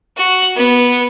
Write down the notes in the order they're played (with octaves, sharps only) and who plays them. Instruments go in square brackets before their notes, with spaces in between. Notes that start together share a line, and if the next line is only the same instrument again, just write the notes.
[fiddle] F#4
B3